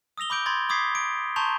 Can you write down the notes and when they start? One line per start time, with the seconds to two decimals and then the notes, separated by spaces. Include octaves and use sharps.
0.18 D#6 E6 A#6 F7 G7
0.30 B5 D6 G6 D7
0.46 B5 C6 G#6 A6
0.69 B5 D6 D#6 G#6 B6 C7
0.95 D7
1.36 A5 A#5 C6 C#6 G6 F7